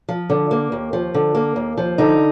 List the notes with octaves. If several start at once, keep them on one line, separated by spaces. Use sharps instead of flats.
F3
D3
A#3
D#2
F3
D3
A#3
D#2
F3
D3 D#4